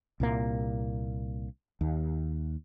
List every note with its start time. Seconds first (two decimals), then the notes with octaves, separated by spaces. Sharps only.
0.20 C2 A#2 A#3
1.81 D#2